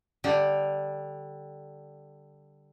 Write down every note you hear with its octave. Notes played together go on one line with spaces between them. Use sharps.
D3 G3 G4